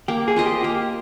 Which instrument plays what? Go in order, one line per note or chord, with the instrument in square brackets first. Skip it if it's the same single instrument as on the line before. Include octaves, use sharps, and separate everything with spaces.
[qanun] A#3 [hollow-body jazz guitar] G4
[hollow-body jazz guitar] G#4
[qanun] F4 C5 D#5
[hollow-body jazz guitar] G4
[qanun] A#3 [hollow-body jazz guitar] G4